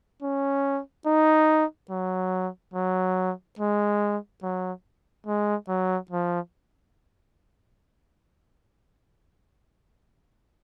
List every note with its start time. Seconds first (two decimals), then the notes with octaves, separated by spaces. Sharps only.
0.22 C#4
1.06 D#4
1.90 F#3
2.74 F#3
3.59 G#3
4.43 F#3
5.27 G#3
5.69 F#3
6.11 F3